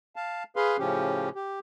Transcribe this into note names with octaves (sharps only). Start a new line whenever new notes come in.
F5 A5
G#4 B4 F5 C6
A2 C#3 F3 C#4 G4
G4